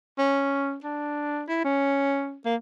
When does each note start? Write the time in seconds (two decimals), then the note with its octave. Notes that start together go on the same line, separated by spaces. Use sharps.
0.18 C#4
0.84 D4
1.48 E4
1.64 C#4
2.46 A#3